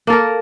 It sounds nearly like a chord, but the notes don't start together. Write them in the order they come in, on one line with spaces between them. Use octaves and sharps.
A#3 A4 A#4